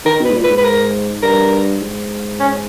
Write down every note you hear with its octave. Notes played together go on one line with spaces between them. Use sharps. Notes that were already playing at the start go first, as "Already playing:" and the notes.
D#3 A#4
B2 B4
G#2
A#2
B4
G#2
B4
A#4
G2 A#4
G#2
C#4